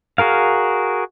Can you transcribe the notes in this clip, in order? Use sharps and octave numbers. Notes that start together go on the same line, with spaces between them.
F#4 G#4 A#4 F5